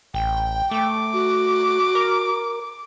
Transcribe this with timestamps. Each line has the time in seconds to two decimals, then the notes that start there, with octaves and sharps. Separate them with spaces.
0.14 A1 G5
0.71 A3 D6
1.13 F#4
1.95 A#4